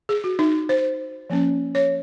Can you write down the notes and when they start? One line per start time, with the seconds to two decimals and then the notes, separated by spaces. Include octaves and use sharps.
0.09 G#4
0.24 F#4
0.39 D#4
0.69 C5
1.30 F3 A#3 C#4
1.75 C#5